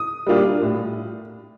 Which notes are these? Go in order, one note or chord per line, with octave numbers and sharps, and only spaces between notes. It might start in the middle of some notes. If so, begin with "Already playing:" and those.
Already playing: D#6
G3 A#3 D4 F4
A2